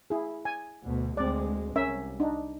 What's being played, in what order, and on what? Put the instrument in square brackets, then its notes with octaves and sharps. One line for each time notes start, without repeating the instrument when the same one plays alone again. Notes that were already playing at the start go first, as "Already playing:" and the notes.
[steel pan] E4 G#4
G#5
[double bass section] D2 B2
[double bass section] D2 G#3 [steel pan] C4 D5
[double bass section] C2 [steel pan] C#4 A#4 E5
[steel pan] D4 D#4